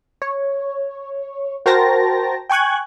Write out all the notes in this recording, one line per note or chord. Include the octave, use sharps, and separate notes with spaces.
C#5
F#4 A#4 C5 G5 A5 A#6
G5 G#5 C#6 F#6 G#6